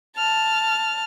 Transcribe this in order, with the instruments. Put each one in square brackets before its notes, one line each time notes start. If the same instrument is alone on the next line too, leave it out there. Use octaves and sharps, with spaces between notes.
[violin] A5 F6